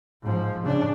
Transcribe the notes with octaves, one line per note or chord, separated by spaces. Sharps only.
G#2 F3
C#3 D4